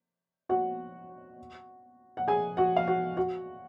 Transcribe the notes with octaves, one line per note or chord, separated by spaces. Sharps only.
F#4 F#5
F#5
G#4 G#5
F#4 F#5
F5
F#4 F#5
F#4 F#5